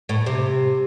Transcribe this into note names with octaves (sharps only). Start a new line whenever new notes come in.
A2
C3